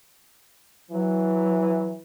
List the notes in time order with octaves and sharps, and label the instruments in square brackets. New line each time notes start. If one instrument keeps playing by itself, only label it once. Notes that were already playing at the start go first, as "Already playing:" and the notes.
[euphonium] E3 [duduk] F#3